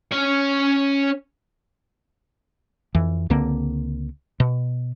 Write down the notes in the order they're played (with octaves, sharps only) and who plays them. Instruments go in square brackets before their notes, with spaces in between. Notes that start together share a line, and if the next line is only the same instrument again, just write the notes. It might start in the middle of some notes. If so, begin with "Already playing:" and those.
[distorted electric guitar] C#4 C#5
[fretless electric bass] F2 E3
C#2 D3 A#3 C4
B2